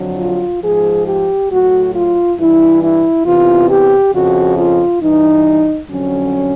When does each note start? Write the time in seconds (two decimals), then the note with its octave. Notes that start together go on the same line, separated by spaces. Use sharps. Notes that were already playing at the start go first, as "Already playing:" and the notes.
Already playing: F2 D3 F#3
0.18 F4
0.63 G#2 F3 G#4
1.06 G4
1.50 A2 F#3 F#4
1.95 F4
2.38 G2 E3 E4
2.82 E4
3.26 E2 C3 E3 F4
3.70 G4
4.14 F2 C#3 F3 F#4
4.58 F4
5.02 G2 E3 D#4
5.89 F2 D3 F#3 C#4